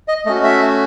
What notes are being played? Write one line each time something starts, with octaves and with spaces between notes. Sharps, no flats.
D#5
A3 C#4 F#4 D#5
E5